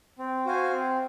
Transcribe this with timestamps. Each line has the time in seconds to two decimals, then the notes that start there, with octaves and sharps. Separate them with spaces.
0.18 C4
0.45 F#4 C5 F5 G#5
0.71 C4